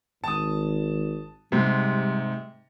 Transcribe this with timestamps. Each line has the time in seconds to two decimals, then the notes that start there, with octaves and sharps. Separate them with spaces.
0.24 G#1 A5 D#6
1.52 G#2 C3 G3